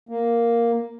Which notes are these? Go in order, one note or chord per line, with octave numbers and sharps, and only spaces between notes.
A#3